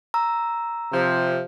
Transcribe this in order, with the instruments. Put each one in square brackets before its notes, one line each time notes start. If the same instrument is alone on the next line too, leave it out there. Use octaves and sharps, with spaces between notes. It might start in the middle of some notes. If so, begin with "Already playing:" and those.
[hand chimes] A#5 E6
[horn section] C3 F3